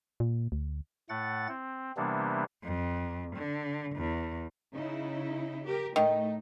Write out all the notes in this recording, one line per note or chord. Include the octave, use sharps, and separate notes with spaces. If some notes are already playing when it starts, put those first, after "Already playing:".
A#2
D2
A2 A3 F#5 A6
C4
C3 E3 G3 A#3 B3 D4
F2
D3
E2
C#3 D#4 E4
G4 A#4
A2 D#3 A3 D#4